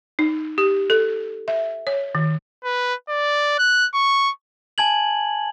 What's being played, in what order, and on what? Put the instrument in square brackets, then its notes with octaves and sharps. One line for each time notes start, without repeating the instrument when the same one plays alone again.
[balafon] D#4
G4
A4
E5
C#5
D#3
[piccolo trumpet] B4
D5
F#6
C#6
[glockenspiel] G#5 A5 G#6 F#7